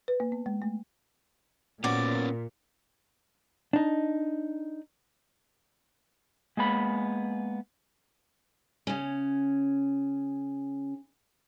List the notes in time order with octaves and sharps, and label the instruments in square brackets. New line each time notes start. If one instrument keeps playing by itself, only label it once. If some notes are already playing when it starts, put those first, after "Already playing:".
[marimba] B4
A#3
B3
G#3
A3
[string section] A#2 [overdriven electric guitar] B3 C#4 [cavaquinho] F#4 D5
[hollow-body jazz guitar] D4 D#4
[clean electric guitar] G#3 A#3 B3 B5
[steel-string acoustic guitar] C#3 C#4